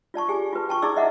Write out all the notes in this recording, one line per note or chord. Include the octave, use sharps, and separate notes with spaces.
F4 D5 A5 C#6
G4 G#4 G#5
F4 F#4 B4 A5
G5 A5 C#6
E4 G#4 D5 C#6 D6 E6
D#5 E5 F#5 A#5 D6